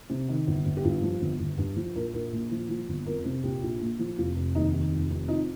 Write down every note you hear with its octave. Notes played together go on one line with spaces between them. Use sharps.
C3
D#3
G1
G1
G4
G2 F4
F3
G1
G1
G2
F3
A#1 A#4
A#1 A#4
A#2
F3
F3
G1
F2 A#4
C3
A#1 G4
A#1
A#2
F3
F1 F4
F1
D#2 D#4
D#3
F1
F1
F2 D#4